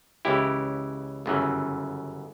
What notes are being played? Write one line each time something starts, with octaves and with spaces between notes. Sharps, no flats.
C#2 C#3 E3 E4 G4
G1 F#2 C#3 E3